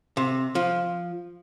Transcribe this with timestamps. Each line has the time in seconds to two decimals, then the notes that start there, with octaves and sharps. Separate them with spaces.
0.17 C3
0.55 F3